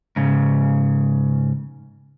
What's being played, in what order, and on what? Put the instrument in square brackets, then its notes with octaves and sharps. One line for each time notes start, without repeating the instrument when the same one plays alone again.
[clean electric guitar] G#2 C#3